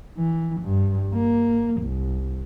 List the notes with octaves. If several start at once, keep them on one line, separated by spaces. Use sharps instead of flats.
E3
G2
A#3
C2